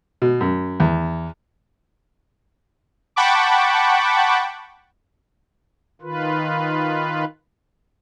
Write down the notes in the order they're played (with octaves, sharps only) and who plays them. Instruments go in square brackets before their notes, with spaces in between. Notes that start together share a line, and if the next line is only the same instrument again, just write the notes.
[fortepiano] B2
F#2
E2
[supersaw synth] F#5 G5 A5 B5 C#6 D6
[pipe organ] D#3 F4 B4